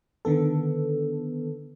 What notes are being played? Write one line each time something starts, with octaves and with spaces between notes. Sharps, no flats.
D3 D#3 B3 A4